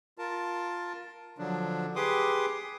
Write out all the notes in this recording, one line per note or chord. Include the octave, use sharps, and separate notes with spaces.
F4 A#4 A5
D3 F3 F#3 D4
G4 G#4 B4 C6 D6 D#6